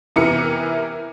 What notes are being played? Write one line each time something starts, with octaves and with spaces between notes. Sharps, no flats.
C3 E3 B3 A#4 C#7